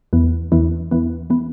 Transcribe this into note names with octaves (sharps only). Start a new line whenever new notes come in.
E2 E3 B3
E2 E3 B3
E2 E3 B3
E3 B3